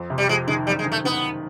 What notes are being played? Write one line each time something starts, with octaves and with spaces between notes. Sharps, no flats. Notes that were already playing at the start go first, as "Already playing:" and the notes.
Already playing: F2
C3
G3
F2 G#3
D#3 G#3
F#1 G3
G#3
D#3
A3
D#3 B3